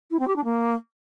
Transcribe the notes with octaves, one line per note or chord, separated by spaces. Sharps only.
E4
C4
G4
D4
A#3